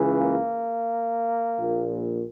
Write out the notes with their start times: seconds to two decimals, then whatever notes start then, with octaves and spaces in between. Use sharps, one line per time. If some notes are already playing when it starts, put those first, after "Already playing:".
Already playing: C#2 C#3 E3
0.19 A#3
1.57 A#1 A#2